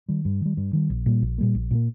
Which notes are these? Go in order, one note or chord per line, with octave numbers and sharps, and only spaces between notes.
D#3 G3
G2
D#3 G3
G2
D#3 G3
A#1
A#2 G3 A#3
A#1
A#2 G3 A#3
A#1
A#2 G3 A#3